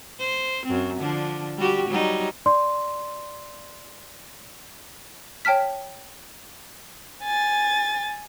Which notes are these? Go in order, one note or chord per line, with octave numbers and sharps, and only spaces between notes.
C5
F#2 C4
D3 F3 D4
G3 F#4 G4
F#3 G3 D#4
D5 C6
C#5 G5 A5 F6 B6
G#5 A6